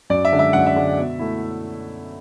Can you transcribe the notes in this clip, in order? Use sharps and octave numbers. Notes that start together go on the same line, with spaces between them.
F#2 D5
E5
D3 G#3 D4
E5
F#2 F#5
E5
D3 G#3 D4
B2
A3 E4